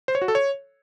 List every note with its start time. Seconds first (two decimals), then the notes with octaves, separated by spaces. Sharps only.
0.08 C5
0.15 C#5
0.22 F#4
0.28 A4
0.35 C#5